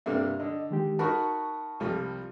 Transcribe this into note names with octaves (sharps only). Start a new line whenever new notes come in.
G2 C3 A#3 E5
D3 D#5
D#3 G#3 G4
D#4 F#4 A#4 A5 B5 C#6
C2 F3 G3